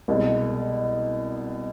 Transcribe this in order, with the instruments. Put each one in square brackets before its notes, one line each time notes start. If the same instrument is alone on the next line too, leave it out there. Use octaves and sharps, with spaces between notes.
[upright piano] C2 B2 G#3